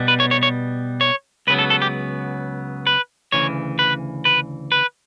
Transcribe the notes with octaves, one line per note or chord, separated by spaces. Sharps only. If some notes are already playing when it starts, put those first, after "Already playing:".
Already playing: B2 G3 B3
B4
C#5
C#5
C#5
C#5
C#2 C#3 F#3 B3 B4
A4
A4
G4
B4
D2 C#3 E3 C#5
B4
B4
B4